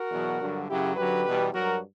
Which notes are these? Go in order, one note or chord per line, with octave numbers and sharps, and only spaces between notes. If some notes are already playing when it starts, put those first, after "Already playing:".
Already playing: F#4 A#4
E2 B2 F#3
G2 D3 F#3
F#2 C#3 F#3 E4 G4
F#2 D3 F#3 G4 B4
E2 B2 G3
G2 F#3 F#4 A#4